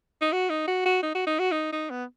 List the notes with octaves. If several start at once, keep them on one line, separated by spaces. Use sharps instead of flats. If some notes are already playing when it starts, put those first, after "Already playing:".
D#4
F#4
D#4
F#4
F#4
D#4
F#4
D#4
F#4
D#4
D#4
B3